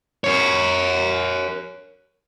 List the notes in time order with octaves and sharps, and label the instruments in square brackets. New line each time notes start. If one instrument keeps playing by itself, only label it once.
[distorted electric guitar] A#4 C#5